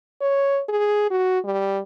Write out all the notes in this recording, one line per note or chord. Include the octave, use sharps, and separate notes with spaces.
C#5
G#4
F#4
G3